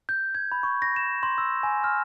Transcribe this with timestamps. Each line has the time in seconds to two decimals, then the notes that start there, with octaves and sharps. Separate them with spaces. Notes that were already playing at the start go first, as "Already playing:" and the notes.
0.09 G6
0.35 G#6
0.52 B5
0.63 C#6
0.82 A#6
0.96 E7
1.23 C6
1.38 E6
1.63 G#5
1.84 F6